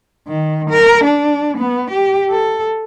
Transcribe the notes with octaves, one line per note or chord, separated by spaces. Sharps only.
D#3
A#4
D4
B3
G4
A4